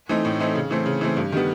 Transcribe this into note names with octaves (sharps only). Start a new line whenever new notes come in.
E3 A3 C4 D#4
A2
E3 A3 C4 D#4
C#3
E3 A3 C4
C#3
E3 A3 C4
G2
D#3 G3 B3